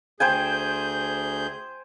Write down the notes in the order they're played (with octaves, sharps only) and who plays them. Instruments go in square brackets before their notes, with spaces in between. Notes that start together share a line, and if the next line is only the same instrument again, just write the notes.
[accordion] D2 G#4 G6 [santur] C5 G5 G#5